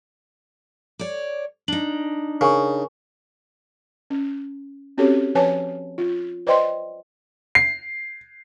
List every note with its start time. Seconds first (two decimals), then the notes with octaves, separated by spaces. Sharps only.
0.99 C#5 D5
1.68 D4 D#4 F#7
2.41 C#3 A#4 G#5 C#6
4.10 C#4
4.98 C4 C#4 F#4 G4 A4 C#5
5.35 F3 B4 C#5 G#5 A5
5.98 F4
6.47 B4 C5 D5 D#5 G5 C6
7.55 C7